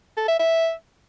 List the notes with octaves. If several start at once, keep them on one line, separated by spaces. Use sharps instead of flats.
A4
E5
E5